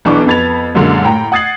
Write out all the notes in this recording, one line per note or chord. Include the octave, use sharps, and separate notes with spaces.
B1 E3 B3 D4 C#6 D6
F2 B3 B5 G#6 A6 F7
C2 F#2 A#2 D3 G#3 A#3
A2 G5 A#5
F#5 D#6 G#6 A6 C7 F#7